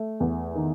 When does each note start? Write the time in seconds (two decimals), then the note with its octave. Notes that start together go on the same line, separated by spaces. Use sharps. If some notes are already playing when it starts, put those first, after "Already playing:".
Already playing: A3
0.20 E2
0.55 D#3